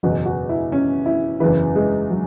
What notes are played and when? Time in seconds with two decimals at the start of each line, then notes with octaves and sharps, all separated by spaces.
0.03 F#1 E2 B2 F#4
0.26 F#4
0.49 E4
0.72 C#4
1.06 E4
1.40 F#1 E2 C#3 E3 B4
1.75 G#3
2.10 F#3